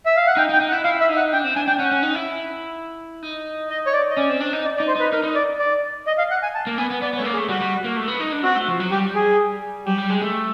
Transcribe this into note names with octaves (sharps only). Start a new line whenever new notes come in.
E5
F5
F#5
D#4 G5
D#4
G5
D#4
F#5
E4
E4 F5
E5
D#4
F#5
D4 G5
C4
D4 G#5
D4 G5
C#4 F#5
C#4
D#4
E4
D#4
D#5
C#5
D5
D#5
C#4 D5
C4
D4
D#4
D5
D5
D#4
C5
D#4 B4
D#4 A#4
D#4
D5
D5
D#5
F5
F#5
G#5
A5
A#3
B3 G#5
B3
B3 D5
B3 C#5
A3
A#3
G#4
A3
G3 F#4
G3
A#3
A3
B3
D#4
D4
C4 F#4
A3
F3
F#3
G3 G4
G#4
F#3 G4
G3
G#3
A3